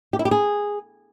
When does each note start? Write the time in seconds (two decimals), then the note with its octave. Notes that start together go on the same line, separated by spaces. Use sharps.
0.13 G4
0.19 E4
0.25 G4
0.31 G#4